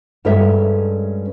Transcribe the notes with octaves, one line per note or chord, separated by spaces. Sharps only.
G2 G#3 C#4 A4 A#4 E5